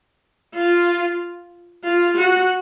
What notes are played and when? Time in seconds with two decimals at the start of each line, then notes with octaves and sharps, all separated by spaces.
0.55 F4
1.84 F4
2.17 F#4